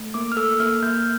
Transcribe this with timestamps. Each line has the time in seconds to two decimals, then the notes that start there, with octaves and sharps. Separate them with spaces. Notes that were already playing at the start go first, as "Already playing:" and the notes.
Already playing: A3
0.14 A#3 D6
0.32 F6
0.37 A4 E6
0.60 A#3 F6
0.82 A#3 G6